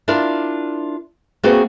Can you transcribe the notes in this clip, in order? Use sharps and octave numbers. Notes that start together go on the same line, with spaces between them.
D4 E4 F4 A#4 D5
A3 A#3 C4 F#4 G#4 B4